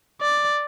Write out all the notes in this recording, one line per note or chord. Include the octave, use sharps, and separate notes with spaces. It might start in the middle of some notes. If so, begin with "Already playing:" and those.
D5